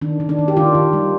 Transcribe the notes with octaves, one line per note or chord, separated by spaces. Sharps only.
D#3 D4
D#3
D4
D#3
G4
D#3 D4 F4
D#3
G3